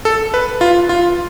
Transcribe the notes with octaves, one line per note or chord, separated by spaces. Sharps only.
A4
B4
F4
F4